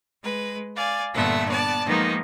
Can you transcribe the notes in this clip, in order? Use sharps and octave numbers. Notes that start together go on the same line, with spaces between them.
G#3 B4
D5 F5 G#5
G2 A#2 D3 A3 B3 E5
B3 D5 A5
D#3 F3 G#3 A#3 B3 D#4